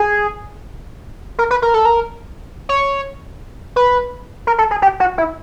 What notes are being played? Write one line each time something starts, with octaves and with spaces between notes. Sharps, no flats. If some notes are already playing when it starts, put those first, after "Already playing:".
Already playing: G#4
A#4
B4
A#4
A4
A#4
C#5
B4
A#4
A4
G#4
G4
F#4
E4